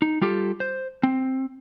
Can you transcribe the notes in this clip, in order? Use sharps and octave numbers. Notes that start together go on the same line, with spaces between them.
D#4
G3 F4 G4 A4
C5
C4